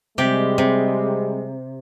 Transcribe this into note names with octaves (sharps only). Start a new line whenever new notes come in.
C3 G3 G#3 G4
C3